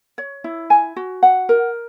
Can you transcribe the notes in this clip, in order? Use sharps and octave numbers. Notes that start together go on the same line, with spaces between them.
C#5
E4
G#5
F#4
F#5
A#4